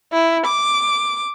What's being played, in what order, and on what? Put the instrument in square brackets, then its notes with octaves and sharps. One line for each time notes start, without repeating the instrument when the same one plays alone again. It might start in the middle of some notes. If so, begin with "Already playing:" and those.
[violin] E4
D6